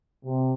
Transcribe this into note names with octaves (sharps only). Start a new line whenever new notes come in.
C3